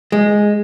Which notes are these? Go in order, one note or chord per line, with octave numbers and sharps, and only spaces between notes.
G#3